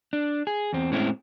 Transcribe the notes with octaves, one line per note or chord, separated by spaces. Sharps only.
D4
G#4
E2 C4
A2 G#3 C4 C#4 E4